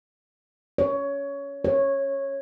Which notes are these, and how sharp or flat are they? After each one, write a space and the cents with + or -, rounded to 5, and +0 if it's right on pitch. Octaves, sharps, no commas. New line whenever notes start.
C#5 +15
C#5 -15